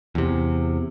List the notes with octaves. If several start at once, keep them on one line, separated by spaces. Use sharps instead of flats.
E2 C3